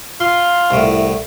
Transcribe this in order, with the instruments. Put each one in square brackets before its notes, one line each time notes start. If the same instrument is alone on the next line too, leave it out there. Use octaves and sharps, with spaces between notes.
[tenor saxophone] F4 [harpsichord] C6
[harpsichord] C2 A2